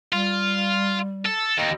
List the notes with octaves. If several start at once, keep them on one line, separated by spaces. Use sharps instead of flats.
G3 F4
A4
D#2 D#5